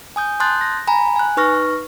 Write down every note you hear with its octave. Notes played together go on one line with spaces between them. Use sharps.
G#5 D#6 G6
A5 C6 D#6 F#6 G6 A6
A#6
G#5 A#5 B5
G#5 F#6
D#4 B4 C#6 F6 A#6